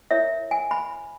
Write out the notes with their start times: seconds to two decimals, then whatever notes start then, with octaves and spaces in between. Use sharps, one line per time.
0.11 E4 A#4 C#5 E5
0.51 G#5
0.71 B5